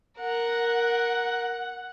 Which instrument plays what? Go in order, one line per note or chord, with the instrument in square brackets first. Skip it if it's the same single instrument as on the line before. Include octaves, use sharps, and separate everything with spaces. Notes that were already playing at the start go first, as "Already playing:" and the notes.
[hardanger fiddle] A#4 [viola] F#5